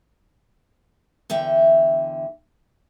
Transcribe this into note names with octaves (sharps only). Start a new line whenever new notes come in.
E2 D3 E5 G5